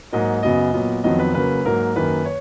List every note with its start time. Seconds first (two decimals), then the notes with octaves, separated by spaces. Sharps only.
0.13 G#2 F#3 A#3 D#5
0.43 F#2 C#3 F#3 B3 D#5
0.74 A#2 F#3 B3
1.04 F2 D#3 F#3 B3 D#5
1.19 B4
1.34 C#3 F#3 A#3 B4
1.65 G#2 F#3 A#3 A#4
1.96 F#2 D#3 A#3 B4
2.25 C#5